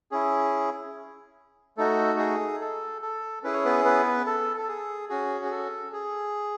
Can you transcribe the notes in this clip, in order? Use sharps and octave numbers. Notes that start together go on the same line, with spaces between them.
C#4 E4 G#4
A3 D#4 F#4 A4
G#4
A4
A4
C#4 E4 G#4 B4
C#5
B3 B4
B3 B4
A4
A4
G#4
C#4 F#4 G#4
G#4
A4
G#4